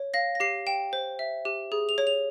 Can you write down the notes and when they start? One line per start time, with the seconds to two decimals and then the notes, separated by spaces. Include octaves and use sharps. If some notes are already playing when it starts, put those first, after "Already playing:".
Already playing: C#5
0.14 F5 A#6
0.35 A#6
0.40 G4 C7
0.67 G5 E7
0.93 C5
1.19 E5
1.45 G4
1.72 G#4
1.89 F7
1.98 C#5
2.07 F7